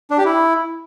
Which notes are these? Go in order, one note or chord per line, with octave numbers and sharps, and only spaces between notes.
D4
G4
E4